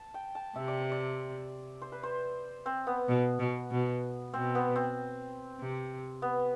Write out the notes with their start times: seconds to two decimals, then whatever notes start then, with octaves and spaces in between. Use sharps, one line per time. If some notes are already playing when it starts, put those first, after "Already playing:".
Already playing: A5
0.14 G5
0.35 A5
0.56 C3 E5
0.68 D5
0.80 C5
0.92 D5
1.82 C5
1.92 B4
2.03 C5
2.66 C4
2.87 B3
3.08 B2
3.39 B2
3.71 B2
4.33 B2 C4
4.55 B3
4.76 C4
5.59 C3
6.22 B3